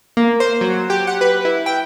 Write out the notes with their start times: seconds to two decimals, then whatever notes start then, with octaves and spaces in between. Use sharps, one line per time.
0.17 A#3
0.40 C5
0.61 F#3
0.90 G4
1.07 F#5
1.21 B4
1.45 E4
1.66 G5